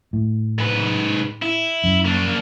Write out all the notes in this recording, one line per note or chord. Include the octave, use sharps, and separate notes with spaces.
A2
G#2 B4
E4
F#2
A#3 D4